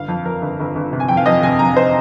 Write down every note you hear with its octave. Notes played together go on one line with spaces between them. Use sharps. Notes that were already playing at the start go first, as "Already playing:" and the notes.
Already playing: G1 F5
F2
F2 A#4
G1
G1
G1
C3
G#5
F2 G5
F5
F2 D#5
C3 G#5
F2 A#5
C5